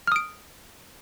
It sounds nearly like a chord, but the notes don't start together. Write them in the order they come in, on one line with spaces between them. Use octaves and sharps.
F6 D#6 D7